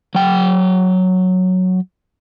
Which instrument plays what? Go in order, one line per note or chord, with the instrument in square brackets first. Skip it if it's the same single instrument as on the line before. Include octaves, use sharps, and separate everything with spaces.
[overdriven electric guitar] F#3 G5